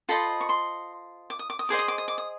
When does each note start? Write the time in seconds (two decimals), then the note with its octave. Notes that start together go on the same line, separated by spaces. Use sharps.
0.09 F4 A4 C5 D#5 B5
0.41 C#6
0.49 C6
1.30 D6
1.39 D#6
1.50 D6
1.59 D#6
1.69 G#4 C5 D#5 D6
1.79 D#6
1.88 D6
1.98 D#6
2.08 D6
2.18 D#6